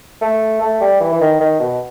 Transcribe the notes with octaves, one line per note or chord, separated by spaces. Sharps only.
A3
A3
G3
E3
E3
D#3
D#3
B2